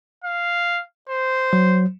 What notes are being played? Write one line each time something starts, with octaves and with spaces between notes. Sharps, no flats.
F5
C5
F#3